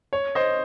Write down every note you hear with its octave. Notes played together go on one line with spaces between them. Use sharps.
C#5
C5 D#5